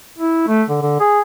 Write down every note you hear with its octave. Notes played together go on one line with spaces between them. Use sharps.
E4
A3
D3
D3
G#4